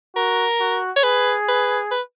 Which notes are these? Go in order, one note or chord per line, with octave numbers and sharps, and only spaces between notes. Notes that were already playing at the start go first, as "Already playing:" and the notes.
F#4 A#4
F#4
C#5
G#4 B4
B4
B4